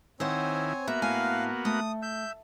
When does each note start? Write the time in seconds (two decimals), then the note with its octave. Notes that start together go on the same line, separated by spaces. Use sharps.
0.20 D#3 C4 E4 C5 C#5 F#5 G#5
0.88 A#3 B3 F#4 E5
1.02 A2 F5 G#5
1.65 A3 D#6
2.02 E5 G6